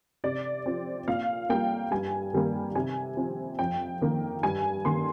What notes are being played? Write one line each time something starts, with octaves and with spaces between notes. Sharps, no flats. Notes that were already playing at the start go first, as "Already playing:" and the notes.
C3 D5
F3 C4
A#2 F5
G3 A#3 G5
G2 G#5
D#3 G3 A#3
C3 G#5
F3 C4
F2 G5
D#3 A#3
G2 G#5
D#3 A#3 C6